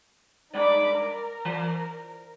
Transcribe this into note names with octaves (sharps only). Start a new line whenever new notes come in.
G2 G#3 D#4 D5 B5 D6
A#4
E3